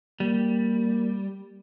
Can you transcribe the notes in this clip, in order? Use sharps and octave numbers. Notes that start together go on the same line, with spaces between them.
G3 A#3